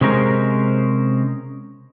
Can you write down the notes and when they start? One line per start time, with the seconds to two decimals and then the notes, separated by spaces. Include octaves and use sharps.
0.01 C3 G#3 C#4 A#4 C5